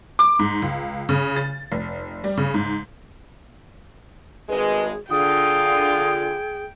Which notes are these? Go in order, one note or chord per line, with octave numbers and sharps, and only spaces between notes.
D6
G#2
C#2
C#3
A6
F1
G3
C#3
G#2
G#1 G2 G#3 G#4 B4
D3 F4 G#4 G5 D#6